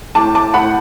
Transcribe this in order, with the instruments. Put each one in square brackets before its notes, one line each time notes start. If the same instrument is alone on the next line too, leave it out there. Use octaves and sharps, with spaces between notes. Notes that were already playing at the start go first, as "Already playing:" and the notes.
[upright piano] A2 A5 D6
A5 D6
A2 F#5 B5